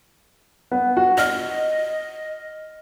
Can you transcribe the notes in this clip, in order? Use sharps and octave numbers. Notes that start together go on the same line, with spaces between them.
B3
F#4
D#5 F6